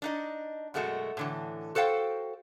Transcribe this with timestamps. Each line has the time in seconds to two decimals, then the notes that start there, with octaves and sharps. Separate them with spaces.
0.02 D4 D#4 D#5
0.74 F#2 B2 G#3 A3 F#4
1.17 A2 D3 E3
1.75 F#4 A4 C5 F5 G5